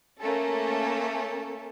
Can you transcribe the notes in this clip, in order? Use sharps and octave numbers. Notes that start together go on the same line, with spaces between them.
A3 A#3 C#4 A4